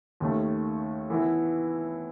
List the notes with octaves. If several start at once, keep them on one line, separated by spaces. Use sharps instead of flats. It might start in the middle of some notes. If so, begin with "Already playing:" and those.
D#2 D#3 A3 C#4
E3 B3 E4